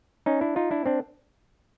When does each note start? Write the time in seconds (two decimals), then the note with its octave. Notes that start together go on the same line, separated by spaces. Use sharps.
0.26 C#4 D#4
0.41 D4 E4
0.56 D#4 F4
0.71 D4 E4
0.86 C4 D4